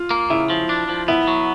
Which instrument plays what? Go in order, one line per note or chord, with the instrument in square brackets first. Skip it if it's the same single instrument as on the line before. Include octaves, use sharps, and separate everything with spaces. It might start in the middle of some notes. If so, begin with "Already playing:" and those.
Already playing: [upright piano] F4
[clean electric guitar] A#3
[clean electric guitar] C#3 [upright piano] E4
[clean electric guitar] F3
D4
F3
[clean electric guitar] B3 [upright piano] E4
[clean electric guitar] F#3